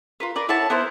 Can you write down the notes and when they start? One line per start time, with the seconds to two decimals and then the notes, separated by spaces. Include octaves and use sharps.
0.20 F4 A#4 B4
0.36 A#4 B4 D5
0.49 E4 C#5 F#5 A5
0.70 B3 E4 A#4 C5